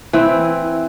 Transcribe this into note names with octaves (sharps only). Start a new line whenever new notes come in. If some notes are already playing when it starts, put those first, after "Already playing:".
E3 C4 E4